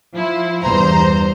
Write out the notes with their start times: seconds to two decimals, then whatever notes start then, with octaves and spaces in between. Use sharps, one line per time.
0.13 F3 E4
0.63 E2 G2 C5 A#5